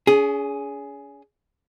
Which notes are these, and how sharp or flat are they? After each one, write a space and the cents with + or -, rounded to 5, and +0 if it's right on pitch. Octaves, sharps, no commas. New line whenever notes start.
C#4 +40 G#4 +5